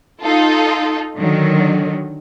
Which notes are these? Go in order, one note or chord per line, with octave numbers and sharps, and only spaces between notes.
D#4 F4 A4
D3 D#3 F#3